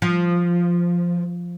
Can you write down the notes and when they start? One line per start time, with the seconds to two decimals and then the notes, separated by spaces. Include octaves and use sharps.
0.02 F3